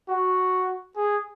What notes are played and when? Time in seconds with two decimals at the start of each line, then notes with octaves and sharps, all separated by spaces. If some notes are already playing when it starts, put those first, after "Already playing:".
0.09 F#4
0.96 G#4